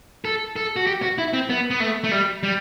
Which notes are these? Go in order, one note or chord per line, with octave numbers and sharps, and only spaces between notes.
A4
A4
F#4
G4
F#4
E4
C4
B3
B3
A3
A3
G3
G3